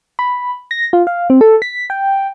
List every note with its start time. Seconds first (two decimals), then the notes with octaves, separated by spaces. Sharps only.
0.19 B5
0.71 A#6
0.93 F4
1.07 F5
1.30 C4
1.41 A4
1.62 B6
1.90 G5